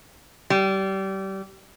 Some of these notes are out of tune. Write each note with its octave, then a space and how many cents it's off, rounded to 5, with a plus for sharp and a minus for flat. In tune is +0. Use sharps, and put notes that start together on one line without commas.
G3 -25